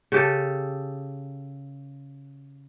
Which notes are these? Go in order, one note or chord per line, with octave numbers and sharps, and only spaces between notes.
C#3 G4 A4